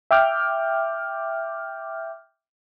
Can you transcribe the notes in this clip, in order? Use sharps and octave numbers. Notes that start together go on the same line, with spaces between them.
E5 G5 D6 F6 G6